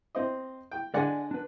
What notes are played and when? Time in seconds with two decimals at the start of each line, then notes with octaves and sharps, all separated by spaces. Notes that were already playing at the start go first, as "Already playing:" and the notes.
0.15 C4 C5 D#5
0.72 G5
0.94 D3 G#3 D5 F#5 G#5
1.31 D4 B4